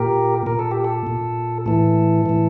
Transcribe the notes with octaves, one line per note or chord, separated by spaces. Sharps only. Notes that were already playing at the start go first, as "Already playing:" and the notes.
Already playing: A#2 G4 A#4
A#2 A#4
A4
G4
A4
A#2
A2 E3 A4
A2 E3